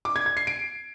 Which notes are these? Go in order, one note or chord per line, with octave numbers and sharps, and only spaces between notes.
D6
G#6
G#6
C7
D7